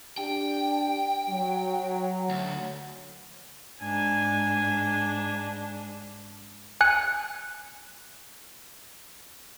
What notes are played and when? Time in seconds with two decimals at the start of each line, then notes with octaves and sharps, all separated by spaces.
0.18 D4 G4 G5
1.30 F#3
2.29 D2
3.81 G#2 D4 G#5
6.81 G#5 F#6 C#7